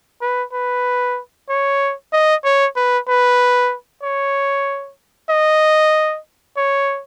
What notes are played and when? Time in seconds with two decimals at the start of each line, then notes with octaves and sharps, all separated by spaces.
0.21 B4
0.53 B4
1.49 C#5
2.13 D#5
2.44 C#5
2.76 B4
3.08 B4
4.03 C#5
5.30 D#5
6.57 C#5